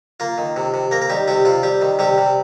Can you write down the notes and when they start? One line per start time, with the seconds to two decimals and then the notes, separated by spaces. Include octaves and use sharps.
0.20 A#3 F4
0.38 D#3
0.56 C3
0.74 C3
0.91 A#3 A#4
1.02 A#4
1.09 D#3 G3 G4
1.28 C3 G3 G4
1.45 C3 F4
1.63 G3 G4
1.81 D#3
1.99 C3 G3 G4
2.18 C3